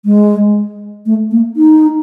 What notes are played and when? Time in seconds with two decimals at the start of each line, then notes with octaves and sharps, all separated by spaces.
0.05 G#3
1.06 A3
1.31 A#3
1.57 D#4